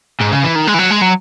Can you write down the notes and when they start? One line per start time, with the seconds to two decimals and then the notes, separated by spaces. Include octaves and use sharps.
0.20 G#2
0.31 C#3
0.43 E3
0.55 D#3
0.67 G#3
0.74 E3
0.79 F#3
0.91 G#3
1.02 F#3